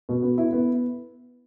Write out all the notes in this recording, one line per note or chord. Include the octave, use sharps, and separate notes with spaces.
B2
B3
E4
B3